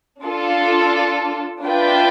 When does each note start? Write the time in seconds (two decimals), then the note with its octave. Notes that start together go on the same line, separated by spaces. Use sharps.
0.23 D4 F4 A4
1.64 D4 F4 B4 E5 G5